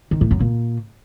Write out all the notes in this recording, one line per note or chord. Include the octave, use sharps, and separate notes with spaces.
D#3
A2
F#2
A#2